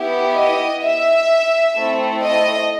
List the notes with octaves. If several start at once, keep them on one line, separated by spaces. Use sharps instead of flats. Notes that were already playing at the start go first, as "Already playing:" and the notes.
Already playing: B3 E4 G4
D#5
E5
A3 C4 E4 A4
D#5